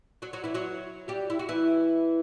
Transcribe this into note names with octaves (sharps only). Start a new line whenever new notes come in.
F#3 F#4
F#3 F#4
E3 E4
F#3 F#4
G3 G4
E4
F#4
E3 E4